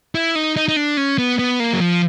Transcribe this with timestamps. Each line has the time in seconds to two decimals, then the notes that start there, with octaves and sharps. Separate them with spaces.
0.15 E4
0.35 D#4
0.56 D#4
0.68 D#4
0.76 D4
0.97 C#4
1.18 B3
1.39 B3
1.60 A#3
1.73 F#3
1.80 F3